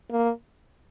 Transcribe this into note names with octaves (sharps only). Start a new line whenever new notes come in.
A#3